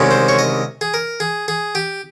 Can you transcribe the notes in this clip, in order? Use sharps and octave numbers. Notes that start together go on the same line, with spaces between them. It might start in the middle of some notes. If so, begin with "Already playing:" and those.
Already playing: C2 C3 D#3 G#3 C#4
C5
C#5
D#5
G#4
A#4
G#4
G#4
G4